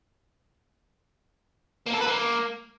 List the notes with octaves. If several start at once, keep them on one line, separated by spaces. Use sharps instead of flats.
A#3
A4
B4
A#3